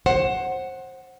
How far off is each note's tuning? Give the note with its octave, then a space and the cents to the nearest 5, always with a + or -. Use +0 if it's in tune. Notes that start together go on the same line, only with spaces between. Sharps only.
C5 +25 F#5 +0